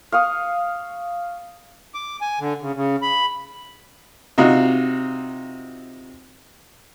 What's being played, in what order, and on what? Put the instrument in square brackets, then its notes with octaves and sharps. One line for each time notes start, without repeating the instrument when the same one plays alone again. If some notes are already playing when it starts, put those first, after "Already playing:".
[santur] F5 C#6 D#6
[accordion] D6
G#5
D3
C#3
C#3
B5
[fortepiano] C3 D#4 F4 F#4